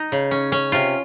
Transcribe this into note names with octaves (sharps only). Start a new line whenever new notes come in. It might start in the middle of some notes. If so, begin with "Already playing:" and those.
Already playing: D#4
C#3
C#4
C#4
C3 F4